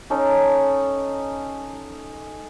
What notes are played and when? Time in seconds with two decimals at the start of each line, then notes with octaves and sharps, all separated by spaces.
0.10 C#4 D#4 A4 C#5